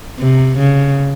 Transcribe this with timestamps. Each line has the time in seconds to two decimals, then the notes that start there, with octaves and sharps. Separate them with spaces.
0.20 C3
0.58 C#3